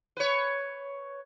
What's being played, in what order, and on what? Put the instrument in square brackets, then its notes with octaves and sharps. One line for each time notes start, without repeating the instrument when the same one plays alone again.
[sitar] B4 C#5